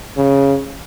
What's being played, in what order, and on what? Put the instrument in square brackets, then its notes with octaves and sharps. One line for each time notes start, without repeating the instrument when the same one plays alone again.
[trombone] C#3